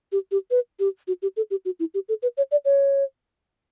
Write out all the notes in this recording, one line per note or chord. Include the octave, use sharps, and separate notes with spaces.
G4
G4
B4
G4
F#4
G4
A4
G4
F#4
E4
G4
A4
B4
C#5
D5
C#5